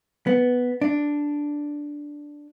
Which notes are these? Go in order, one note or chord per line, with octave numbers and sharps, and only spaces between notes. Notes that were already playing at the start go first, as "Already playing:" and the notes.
B3
D4